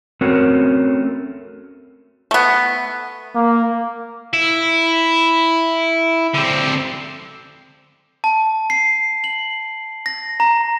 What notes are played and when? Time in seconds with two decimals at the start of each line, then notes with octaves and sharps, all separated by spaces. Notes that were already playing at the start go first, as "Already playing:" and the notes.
0.21 A3 C4 C#4 F#4 A#4
2.31 A3 B3
3.35 A#3
4.33 E4
6.34 D3 C4
8.24 A5
8.70 C7
9.24 F#7
10.06 A#6
10.40 A#5